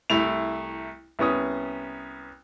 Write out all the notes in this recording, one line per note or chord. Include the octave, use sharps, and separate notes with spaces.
C2 A3 E4 F7
C2 B3 C#4 D#6